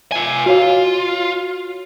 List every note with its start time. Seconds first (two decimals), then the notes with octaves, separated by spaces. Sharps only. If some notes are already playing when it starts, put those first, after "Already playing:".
0.12 F4 G#5
0.46 F4 F#4 C#5 F5